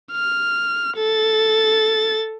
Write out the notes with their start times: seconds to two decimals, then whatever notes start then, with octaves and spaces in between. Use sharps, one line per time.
0.12 F6
0.97 A4 A6